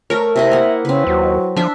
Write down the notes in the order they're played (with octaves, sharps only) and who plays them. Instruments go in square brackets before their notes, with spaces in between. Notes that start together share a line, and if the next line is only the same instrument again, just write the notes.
[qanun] A3 C#5 [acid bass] A#4
[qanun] C3 E4 D#5 [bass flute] E5
[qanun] A#3 F#5
[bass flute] C#3 [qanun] C4 B4
[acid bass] D#2 [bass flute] F#3
[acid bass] F3 [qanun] D4 E5